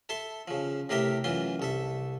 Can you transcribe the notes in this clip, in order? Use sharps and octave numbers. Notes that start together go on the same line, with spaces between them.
A4 E5 A5 C6
C#3 F3
A2 C3 G4 A#4 E5 G5
F#2 E3 F4 C6
C2 A4 E5